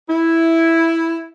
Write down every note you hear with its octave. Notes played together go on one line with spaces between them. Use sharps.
E4